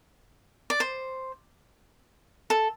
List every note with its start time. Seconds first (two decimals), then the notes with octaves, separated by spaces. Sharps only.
0.70 D5
0.80 C5
2.50 A4